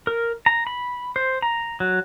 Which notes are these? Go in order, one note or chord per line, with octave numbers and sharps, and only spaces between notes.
A#4
A#5
B5
C5
A#5
F#3